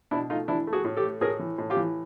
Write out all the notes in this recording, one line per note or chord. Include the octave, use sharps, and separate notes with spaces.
B2 D4 E4
A3 D#4 F4
E3 D4 E4
A3
F#4 G#4
A2
G4 A4
A3
A2 G#4 A#4
E3
A2
F4 G4
E3